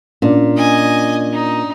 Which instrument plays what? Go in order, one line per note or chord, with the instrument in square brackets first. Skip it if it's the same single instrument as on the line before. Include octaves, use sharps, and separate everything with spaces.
[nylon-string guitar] A#2 [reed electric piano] C#4 D4 D5
[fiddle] D#5 G#5
D#4